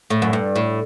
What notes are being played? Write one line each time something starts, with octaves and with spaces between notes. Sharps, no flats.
A2
F#2
G2
A2